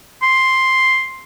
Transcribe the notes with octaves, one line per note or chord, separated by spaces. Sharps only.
C6